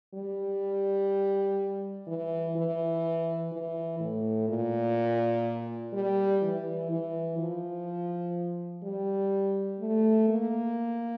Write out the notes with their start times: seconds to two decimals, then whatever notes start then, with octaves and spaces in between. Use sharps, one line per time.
0.14 G3
2.07 E3
2.56 E3
3.52 E3
4.00 A2
4.48 A#2
5.93 G3
6.42 E3
6.91 E3
7.38 F3
8.83 G3
9.80 A3
10.29 A#3